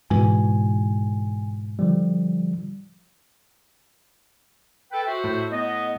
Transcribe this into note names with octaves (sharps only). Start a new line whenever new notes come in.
G#2 B2 E3 G#5
D3 F3 G3
A4 B4 G5
F#4 C5 E5
A2
B3 D#5